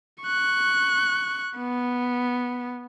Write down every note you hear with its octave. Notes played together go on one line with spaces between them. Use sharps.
C#6 F#6
B3